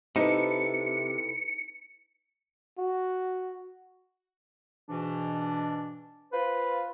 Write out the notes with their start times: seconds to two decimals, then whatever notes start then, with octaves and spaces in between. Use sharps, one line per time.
0.16 C3 D#4 E4 A4 B4 C#7
2.78 F#4
4.89 G#2 B2 E3 D4
6.33 F4 B4 C5